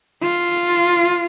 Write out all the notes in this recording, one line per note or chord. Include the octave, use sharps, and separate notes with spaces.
F4